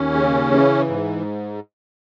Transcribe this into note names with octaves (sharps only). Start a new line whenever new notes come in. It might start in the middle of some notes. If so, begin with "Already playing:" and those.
Already playing: D#2 C#4
C#3
E3
G#2